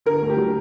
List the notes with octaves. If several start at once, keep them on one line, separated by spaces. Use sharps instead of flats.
D3 A#4
D2
G4
F#3